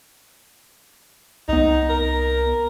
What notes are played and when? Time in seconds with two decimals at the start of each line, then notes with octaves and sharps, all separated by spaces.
1.49 C2 B3 D#4
1.89 A#4